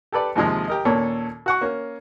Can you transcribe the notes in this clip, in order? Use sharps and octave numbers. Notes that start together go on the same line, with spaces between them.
G4 A4 B4 D5
D#2 C3 F3 G#3 D#4
G4 A#4 D#5
D#2 A#2 C#4 A4 C#5
F#4 F#5 C#6
A#3 C#4